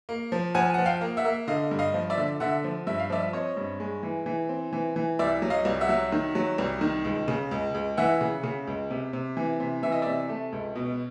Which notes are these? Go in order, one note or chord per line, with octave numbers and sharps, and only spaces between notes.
A#3
F3
F3 F#5 G#5
F3 F#5
F5 G5
A#3
E5 F#5
A#3
D3 D#5 F5
G2
D#5 F5
F3
D5 E5
D3
D3 E5 F#5
F3
G2 E5
F5
F3 D5 E5
C4 C#5 D#5
G2
G#3
E3
E3
C4
E3
E3
C2 D5 E5
F#3
D#5 F5
C2
E5 F#5
F#3
D#3
F#3
C2
D#3
C#2
C#3
C#2
C#2
E3 E5 F#5
C#3
C#3
C#2
C3
C3
E3
C3
E3 E5
D#5
C3 D5 E5
A3
C#2
B2